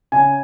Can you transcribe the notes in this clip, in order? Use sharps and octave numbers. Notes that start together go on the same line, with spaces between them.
C#3 G#5